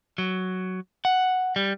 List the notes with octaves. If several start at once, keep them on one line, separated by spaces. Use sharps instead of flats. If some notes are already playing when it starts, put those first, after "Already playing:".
F#3
F#5
G3